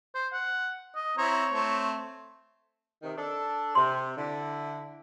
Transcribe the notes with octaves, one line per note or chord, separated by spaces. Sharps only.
C5
F#5
D#5
C4 E4 C#5 A#5
A3 C4
C3 D#3
D4 A4
C3 C6
D3 E4